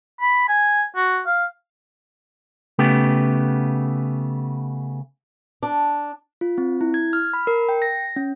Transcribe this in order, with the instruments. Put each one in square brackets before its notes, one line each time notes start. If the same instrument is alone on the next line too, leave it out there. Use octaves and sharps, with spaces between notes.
[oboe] B5
G#5
F#4
F5
[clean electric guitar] C#3 A3 B3 G4
[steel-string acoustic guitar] D4
[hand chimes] F4
C4
E4
G#6
F6
B5
A#4
G5
A#6
C#4